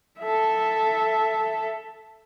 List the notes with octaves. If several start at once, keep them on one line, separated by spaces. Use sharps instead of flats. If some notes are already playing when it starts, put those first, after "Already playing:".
A4 E5